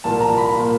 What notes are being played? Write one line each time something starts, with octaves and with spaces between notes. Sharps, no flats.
C2 A#2 F3 A#3 A5
A#5
B5
A#2 F3 A#3